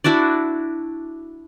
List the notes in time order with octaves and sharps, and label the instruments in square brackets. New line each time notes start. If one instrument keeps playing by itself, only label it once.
[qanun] D4 E4 F#4 D5